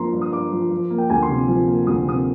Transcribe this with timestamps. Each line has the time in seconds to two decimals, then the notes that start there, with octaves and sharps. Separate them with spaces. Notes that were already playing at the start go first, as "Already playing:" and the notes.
Already playing: G2 F3 A#3 A#5 C6
0.13 G2
0.21 D#6
0.32 G2 D6
0.52 F3
0.70 F3
0.90 A#3
0.98 G5
1.10 D2 G#5
1.22 C6
1.29 C3
1.48 F3
1.67 A#3
1.87 D2 D#6
2.07 C3 D#6